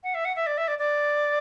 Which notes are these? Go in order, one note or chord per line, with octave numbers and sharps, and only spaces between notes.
F#5
E5
F#5
E5
D5
E5
D5
D5